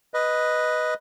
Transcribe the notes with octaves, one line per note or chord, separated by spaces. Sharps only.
B4 D#5